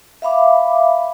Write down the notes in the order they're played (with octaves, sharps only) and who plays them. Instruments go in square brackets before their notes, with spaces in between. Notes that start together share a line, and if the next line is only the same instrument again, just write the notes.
[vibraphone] E5 F5 B5 D6